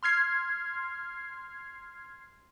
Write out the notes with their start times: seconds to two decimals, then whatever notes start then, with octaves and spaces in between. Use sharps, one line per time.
0.03 C6 F6 G#6 C7